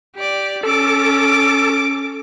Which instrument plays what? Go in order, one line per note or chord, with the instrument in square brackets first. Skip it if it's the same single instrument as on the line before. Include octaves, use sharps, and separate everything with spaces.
[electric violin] G4 D5
[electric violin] C#4 D6 [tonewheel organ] A4